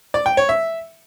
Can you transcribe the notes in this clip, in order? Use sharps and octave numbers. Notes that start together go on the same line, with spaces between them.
D5
G5
C#5
E5